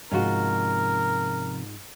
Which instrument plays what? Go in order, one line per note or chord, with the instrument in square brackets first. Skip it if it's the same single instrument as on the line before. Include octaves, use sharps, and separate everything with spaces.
[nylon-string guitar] G#2 F4 F#4 [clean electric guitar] C3 F3 C#4 [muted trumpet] A#4